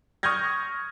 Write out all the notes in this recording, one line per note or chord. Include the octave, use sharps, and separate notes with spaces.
C#6 D#6 F6 G6 G#6 A#6